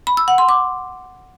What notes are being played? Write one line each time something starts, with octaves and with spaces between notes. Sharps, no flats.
B5
E6
F#5
C6
D6